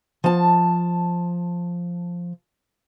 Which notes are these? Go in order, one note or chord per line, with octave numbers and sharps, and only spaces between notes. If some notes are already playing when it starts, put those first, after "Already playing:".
F3 A5